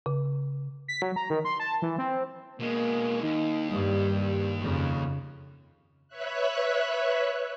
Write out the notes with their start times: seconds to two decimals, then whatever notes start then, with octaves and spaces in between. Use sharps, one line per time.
0.06 C#3
0.88 B6
1.02 F#3
1.16 A#5
1.30 D#3
1.45 C6
1.60 A5
1.82 E3
1.98 C4
2.60 B2 G#3 A#3
3.22 D#2 D#4
3.71 G2 G3
4.60 F2 C#3
6.08 B4 C#5 E5 F#6